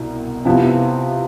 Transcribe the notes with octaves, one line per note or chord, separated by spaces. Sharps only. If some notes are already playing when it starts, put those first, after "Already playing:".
Already playing: C2 B2
C3 F3 B3 E4